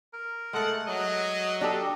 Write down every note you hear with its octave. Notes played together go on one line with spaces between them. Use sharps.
A#4
G#3 A3 A4 F#5
F#3 D#5
D4 G4 A4